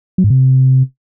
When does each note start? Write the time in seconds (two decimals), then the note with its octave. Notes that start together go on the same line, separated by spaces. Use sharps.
0.18 F#3
0.24 G#2
0.30 C3